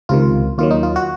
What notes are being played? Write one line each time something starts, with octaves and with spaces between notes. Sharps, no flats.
C#2 C3 D#3 F4
D#2 D#3 F#3 F4
D#4
F4
F#4